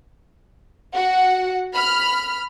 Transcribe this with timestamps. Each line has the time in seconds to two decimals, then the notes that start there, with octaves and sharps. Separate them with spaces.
0.94 F#4 F#5
1.74 B5 F6